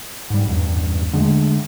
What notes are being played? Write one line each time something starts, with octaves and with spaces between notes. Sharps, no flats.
G#2 G3
A1 E2 G2
D3 G#3 A3